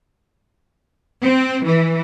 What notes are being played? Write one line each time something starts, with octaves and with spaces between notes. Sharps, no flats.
C4
E3